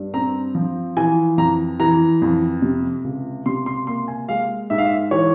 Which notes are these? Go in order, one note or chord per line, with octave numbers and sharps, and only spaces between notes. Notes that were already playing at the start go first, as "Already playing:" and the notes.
Already playing: G2
C4 A#5
F3
E3 G#5
F2 A#5
E3 A#5
F2
C3
C#2
C3 C6
C6
A#3 C6
G#5
G#3 F5
G#2 E5
F5
E5
E3 C#5